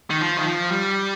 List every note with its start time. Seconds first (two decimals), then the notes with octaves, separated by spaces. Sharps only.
0.10 D#3
0.21 F3
0.37 D#3
0.47 F3
0.72 G3